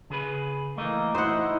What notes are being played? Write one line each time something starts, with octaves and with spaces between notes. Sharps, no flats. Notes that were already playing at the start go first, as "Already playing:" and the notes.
C#3 G#4 B4
E3 A3 A#3 D#5
D#4 E4 C5 F#5